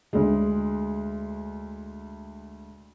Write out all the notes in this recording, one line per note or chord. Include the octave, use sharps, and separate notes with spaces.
D2 G#3